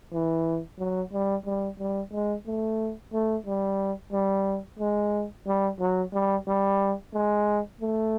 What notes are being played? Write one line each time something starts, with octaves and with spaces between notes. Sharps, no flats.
E3
F#3
G3
G3
G3
G#3
A3
A3
G3
G3
G#3
G3
F#3
G3
G3
G#3
A3